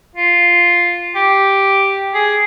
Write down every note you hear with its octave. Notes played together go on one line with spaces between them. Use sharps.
F4
G4
G#4